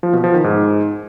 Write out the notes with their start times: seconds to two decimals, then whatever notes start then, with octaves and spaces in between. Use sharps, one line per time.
0.03 F3
0.13 B2
0.24 F3
0.34 D#3
0.44 G#2